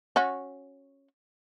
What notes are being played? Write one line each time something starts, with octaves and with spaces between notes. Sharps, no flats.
C#4 F#4